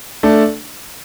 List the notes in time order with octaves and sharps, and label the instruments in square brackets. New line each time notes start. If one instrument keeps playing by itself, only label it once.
[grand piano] A3 D4